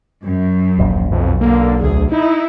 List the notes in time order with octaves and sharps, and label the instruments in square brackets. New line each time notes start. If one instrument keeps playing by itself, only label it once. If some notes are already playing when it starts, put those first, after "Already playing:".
[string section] F#2
[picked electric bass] D#1 A#1
[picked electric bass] B1 [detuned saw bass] F2
[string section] D3 [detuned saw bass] A#3
[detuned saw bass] D2 [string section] G#4
[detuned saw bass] D#4 [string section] E4